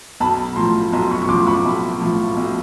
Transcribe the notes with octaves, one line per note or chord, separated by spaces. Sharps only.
B1 A5 B5
A2 F3 A#5 C6
B1 A#5 C6
B5 C#6
C#6
A2 F3 C6 D6
B5 C#6
B1
A2 F3
B1